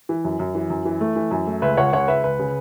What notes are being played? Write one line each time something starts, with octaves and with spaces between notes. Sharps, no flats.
E3
F#2
F#2
E3
F#2
E3
A3
E3
F#2
A3
C#2 B4 E5
C#2 C#5 F#5
C#2 C#5 F#5
C#2 B4 E5
C#2 B4
C#3